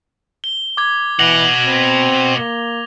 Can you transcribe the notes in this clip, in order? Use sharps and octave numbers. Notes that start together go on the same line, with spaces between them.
G7
D6 G#6
B2 E3 F#5 A#6 F7 G7
C4
A#3